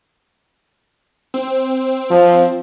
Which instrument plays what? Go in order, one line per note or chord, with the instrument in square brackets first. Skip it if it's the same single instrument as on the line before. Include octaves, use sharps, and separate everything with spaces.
[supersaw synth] C4
[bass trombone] F3